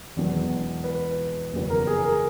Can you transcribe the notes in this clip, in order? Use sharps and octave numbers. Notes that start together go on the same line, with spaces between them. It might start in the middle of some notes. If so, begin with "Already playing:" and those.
E1 E2 B2 F#3 B3
B4
F#1 E2 C#3 F#3 B3
A#4
G#4
A#4